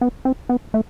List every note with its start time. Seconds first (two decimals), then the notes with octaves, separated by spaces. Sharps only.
0.01 B3
0.25 C4
0.49 B3
0.74 A3